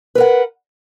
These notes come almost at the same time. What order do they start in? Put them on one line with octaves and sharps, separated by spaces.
B4 A#4 F#5